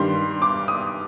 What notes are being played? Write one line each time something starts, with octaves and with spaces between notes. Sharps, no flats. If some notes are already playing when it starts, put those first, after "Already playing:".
Already playing: G2 D#3 G3 C6
D6
D#6